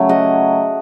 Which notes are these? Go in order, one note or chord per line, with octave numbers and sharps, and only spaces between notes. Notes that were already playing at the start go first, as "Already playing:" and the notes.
Already playing: C#3 F#3 A3 C#5
D#5 F#5